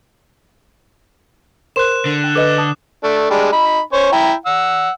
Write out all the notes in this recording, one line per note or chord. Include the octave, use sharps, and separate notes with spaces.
A#4 C5 C6 F#6 E7
D3
G5
A4 B4 D#5 D6 E7
A5 D#6
A3 D4
G3 G#3 D4
D#4 B5
C#4 C5 C#5
E4 G5 A#5
F#5 E6